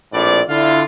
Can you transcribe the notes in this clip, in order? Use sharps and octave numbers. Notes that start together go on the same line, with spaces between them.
A#1 A2 C4 D5
D3 E4 F4